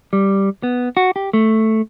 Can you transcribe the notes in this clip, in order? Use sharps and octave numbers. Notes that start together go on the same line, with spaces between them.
G3
B3
F#4
G4
A3